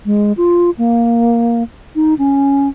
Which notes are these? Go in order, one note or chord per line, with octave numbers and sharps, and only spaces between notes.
G#3
F4
A#3
D#4
C#4